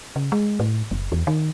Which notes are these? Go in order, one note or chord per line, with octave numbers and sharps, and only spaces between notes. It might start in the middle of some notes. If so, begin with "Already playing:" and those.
C#3
G#3
A2
F#1
E2
D#3